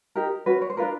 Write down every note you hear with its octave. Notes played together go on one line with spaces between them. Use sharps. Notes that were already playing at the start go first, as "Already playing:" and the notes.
D#4 G4 A#4
C#4 F#4 B4
C#5
C5
D4 F4 A#4 B4